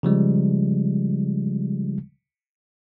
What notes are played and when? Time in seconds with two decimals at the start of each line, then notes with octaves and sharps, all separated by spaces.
0.03 C#3 F3 G3 G#3